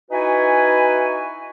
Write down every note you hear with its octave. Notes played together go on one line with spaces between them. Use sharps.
D#4 E4 F#4 B4 G#5